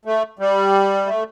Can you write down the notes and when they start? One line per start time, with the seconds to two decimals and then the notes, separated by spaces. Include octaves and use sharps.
0.05 A3
0.39 G3
1.06 A3